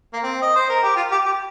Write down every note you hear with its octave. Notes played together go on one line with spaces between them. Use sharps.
A#3
C4
D#5
C5
A#4
G4
F4
G4
G4